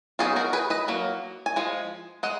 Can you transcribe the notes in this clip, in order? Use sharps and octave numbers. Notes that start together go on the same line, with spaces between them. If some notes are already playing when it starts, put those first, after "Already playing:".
F#3 B3 D#4 F4 G#4
F#4 A#4
G#4 B4
B4 D#5
F#3 A#3
G#5
F3 G#3
G#3 D#5 F#5